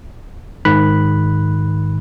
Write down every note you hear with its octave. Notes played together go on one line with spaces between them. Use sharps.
G#2 D#3 B5 F#6